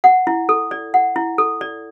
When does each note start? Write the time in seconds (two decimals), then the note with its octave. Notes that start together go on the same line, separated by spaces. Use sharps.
0.04 F#5
0.27 E4
0.49 A4
0.71 D5
0.94 F#5
1.16 E4
1.38 A4
1.61 D5